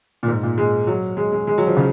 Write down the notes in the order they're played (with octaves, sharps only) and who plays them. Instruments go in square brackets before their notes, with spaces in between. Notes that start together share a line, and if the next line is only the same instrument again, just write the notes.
[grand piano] A#2
G#2
A#2
G#3
F#3
G#3
G#3
G#3
F#3
F3
C#3